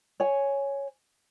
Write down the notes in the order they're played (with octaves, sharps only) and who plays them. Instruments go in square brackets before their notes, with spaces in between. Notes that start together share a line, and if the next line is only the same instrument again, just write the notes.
[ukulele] C#5 G#5